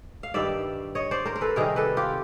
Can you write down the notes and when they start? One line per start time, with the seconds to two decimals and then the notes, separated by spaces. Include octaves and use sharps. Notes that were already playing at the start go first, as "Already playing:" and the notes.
0.23 F5
0.34 G2 D#3 G3 D5 E5
0.95 C#5 D#5
1.11 C5 D5
1.25 A#4 C5
1.35 A#4
1.41 A4 B4
1.56 C3 D#3 G3 G#4 A#4
1.76 A4 B4
1.97 F4 G4